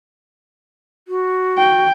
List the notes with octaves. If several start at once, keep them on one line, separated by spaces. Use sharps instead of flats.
F#4
G5